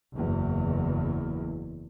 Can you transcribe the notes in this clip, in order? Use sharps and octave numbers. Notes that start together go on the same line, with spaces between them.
F#1 E2